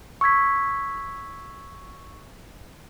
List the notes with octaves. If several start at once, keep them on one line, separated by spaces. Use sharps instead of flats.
C#6 E6 G#6 B6